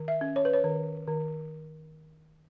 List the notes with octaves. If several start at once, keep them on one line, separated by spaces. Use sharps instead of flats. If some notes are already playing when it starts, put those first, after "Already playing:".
Already playing: D#3
E5
C#4
C#5
B4
C#5
D#3
D#3